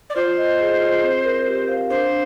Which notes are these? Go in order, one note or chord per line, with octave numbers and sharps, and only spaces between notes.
D5
F4 C5
D#5
G#4
F4
C4
A#4
G4
F5
D4 C5